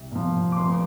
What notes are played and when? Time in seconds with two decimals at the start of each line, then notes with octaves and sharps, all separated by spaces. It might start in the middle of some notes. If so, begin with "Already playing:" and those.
Already playing: C2
0.12 A#2 F3
0.52 D6
0.57 F1 C6